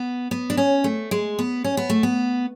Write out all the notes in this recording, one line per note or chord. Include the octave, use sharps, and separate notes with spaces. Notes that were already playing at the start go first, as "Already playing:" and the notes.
Already playing: B3
B3
D4
C#4
A3
G#3
B3
C#4
B3
A3
B3